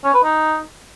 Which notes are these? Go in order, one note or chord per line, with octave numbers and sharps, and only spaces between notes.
C#4
B4
D#4